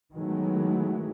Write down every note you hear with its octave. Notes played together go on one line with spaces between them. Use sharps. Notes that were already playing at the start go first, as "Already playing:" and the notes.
D#3 E3 F#3 G#3 A3 B3